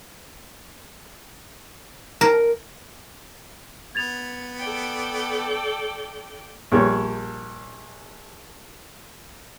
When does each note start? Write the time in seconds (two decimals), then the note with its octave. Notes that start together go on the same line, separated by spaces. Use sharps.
2.21 A#4
3.95 B3 G#6 A6 F7
4.59 A4 D5 G5
6.72 A#1 G3 C#5